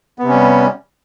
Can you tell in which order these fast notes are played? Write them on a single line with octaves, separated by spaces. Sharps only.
B3 C3 C#4 G3